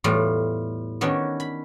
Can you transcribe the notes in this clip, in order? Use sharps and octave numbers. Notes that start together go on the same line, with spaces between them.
E2 A2 G3 F4
D#3 B3 C#4 D4 F#4
B5